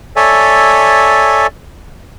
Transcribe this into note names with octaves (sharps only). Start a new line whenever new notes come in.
A4 C#5 D5 E5 G#5